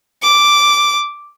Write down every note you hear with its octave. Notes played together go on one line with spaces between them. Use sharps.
D6